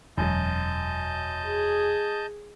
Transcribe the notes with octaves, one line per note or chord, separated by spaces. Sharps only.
E1 F#2 F#3 D#5 A5 G6
G#4